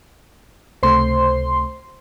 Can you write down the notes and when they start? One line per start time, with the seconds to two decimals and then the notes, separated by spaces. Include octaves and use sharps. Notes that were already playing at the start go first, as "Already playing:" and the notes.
0.83 C#2 C3 A3 C5 C6